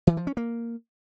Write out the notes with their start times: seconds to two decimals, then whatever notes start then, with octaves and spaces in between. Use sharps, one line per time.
0.07 E3
0.17 F3
0.27 C#4
0.37 A#3